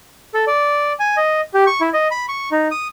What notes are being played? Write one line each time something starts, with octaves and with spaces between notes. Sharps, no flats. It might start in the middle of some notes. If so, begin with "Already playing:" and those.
A4
D5
G#5
D#5
G4
C#6
E4
D#5
B5
C#6
D#4
D#6